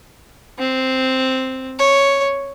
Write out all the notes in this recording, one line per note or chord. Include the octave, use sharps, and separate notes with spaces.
C4
C#5